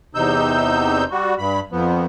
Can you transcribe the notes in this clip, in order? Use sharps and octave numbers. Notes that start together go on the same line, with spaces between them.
E2 C3 D#4 E6 G6
G3 F#4
G2 B5
F2 F3 B3